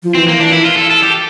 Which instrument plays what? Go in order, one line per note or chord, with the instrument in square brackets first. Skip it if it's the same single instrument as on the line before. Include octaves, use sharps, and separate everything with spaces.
[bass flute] F3
[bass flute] E3 [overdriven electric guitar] C4
[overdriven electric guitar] A#3
[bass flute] E3 [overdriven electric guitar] D4
[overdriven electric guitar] E4
F4
A4
A4
G4